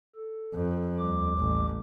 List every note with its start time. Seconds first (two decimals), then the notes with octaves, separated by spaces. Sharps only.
0.15 A4
0.53 F2
0.99 D#2 G3 D6
1.38 A1